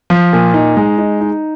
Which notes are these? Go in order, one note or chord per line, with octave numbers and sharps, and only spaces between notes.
F3
A#2
D#4
G#3
D#4
D#4